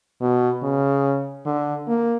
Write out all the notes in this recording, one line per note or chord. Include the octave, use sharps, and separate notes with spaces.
B2
C#3
D3
A#3